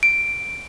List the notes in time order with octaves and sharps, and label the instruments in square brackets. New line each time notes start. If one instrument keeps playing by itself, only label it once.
[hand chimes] D7